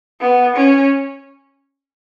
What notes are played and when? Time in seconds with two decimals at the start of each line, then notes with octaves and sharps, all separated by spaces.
0.21 B3
0.57 C#4